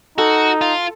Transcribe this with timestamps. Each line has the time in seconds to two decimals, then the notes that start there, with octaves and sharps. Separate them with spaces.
0.18 D#4 F#4 A4
0.61 F4